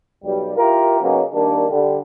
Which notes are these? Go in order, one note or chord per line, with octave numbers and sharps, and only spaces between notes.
B1 G3
E4 F4 G4 A#4
C#3 F#3 A#3 B3 C#4 D#4
D#3 G3 A#3 D4
D3 G3